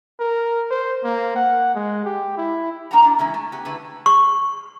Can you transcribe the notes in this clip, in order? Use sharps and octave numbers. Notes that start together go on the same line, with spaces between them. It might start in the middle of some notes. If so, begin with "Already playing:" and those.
A#4
C5
A#3
F#5
G#3
G4
E4
A#3 D4 A#4 F#5 G5 A#5
D4 E4
E3 G#3 C#4 E4
A3
B3 G4
D3 A3 E4 B4
C#6